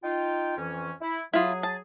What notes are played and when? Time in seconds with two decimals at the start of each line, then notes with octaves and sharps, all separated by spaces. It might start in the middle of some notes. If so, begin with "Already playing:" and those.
0.04 D#4 F4 G5
0.57 F2 E3 C#4
1.01 E4
1.34 F#3 E4 F4 G#4
1.63 A5